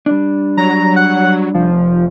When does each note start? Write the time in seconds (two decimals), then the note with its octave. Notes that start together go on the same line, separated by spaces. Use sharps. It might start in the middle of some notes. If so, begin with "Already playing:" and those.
0.06 G3 D4
0.57 F#3 A#5
0.96 F#5
1.54 F1 F3